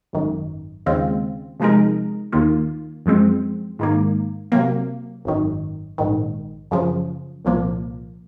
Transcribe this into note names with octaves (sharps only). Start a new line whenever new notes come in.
G#1 F#2 D#3
D#2 C#3 G#3 C4 F4
C3 F3 G#3 D#4 A#4
D#2 D#3 A#3 F4
F#2 F3 G#3 C4
G#2 D#3 A#3
C3 F#3 A#3
G#1 F#2 D#3
A#1 G#2 D#3
F#2 C#3 F3
C2 A#2 F3 A#3